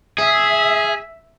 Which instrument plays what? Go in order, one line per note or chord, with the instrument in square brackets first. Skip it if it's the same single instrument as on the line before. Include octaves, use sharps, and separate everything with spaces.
[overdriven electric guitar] G#4 [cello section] E5